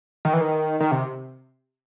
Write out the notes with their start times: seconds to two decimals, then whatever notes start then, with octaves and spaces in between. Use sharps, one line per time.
0.25 D#3
0.33 E3
0.41 D#3
0.80 D#3
0.91 C3